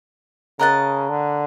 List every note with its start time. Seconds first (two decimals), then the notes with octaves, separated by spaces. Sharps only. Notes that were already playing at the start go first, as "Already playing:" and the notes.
0.59 C#3 A#4 D#5 F#5 A5
1.09 D3